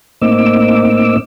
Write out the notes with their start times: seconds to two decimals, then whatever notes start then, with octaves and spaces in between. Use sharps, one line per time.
0.21 A2 A#3 C4 D#4 D6 E6